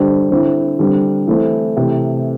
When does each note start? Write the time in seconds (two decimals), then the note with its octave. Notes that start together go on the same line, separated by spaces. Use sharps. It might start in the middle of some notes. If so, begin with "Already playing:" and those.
Already playing: D3 G3 D4 C5
0.31 D3 C4 E4
0.79 D3 G3 C4
1.27 E3 A3 C4 E4
1.76 C3 E3 A3